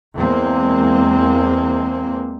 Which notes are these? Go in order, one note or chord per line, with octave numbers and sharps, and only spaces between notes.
E2 G#3 A#3 C4